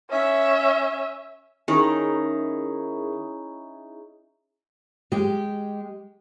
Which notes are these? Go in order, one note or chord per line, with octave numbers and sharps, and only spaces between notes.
C#4 E5
D#3 C#4 D#4 E4 G#4
G#3 G4